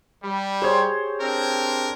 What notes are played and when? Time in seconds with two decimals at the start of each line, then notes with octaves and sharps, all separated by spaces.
0.23 G3
0.62 G4 G#4 C5 C#5 C6
1.21 C4 D4 A#4